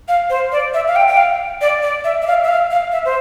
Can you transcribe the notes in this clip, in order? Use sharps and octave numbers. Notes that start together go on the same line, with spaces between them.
F5
C5
D5
E5
F5
G5
G5
F5
D5
D5
E5
E5
F5
E5
F5
F5
E5
C5